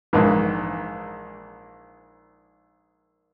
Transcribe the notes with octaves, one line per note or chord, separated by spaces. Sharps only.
A#1 G#2 E3 A#3